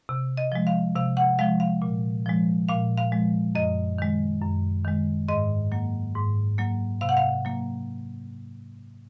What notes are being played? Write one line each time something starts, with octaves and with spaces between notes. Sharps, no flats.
C3
D#5
F3 G#3
F5
C3 F5
F#5
F3 G#3 F5
F5
A#2
F3 G#3
A#2 F5
F5
F3 G#3
F#2 D#5
D#3 G#3
F#2
D#3 G#3
G#2 D#5
F#3 A#3
G#2
F#3 A#3
C3 F5
F#5
F5
F#3 A#3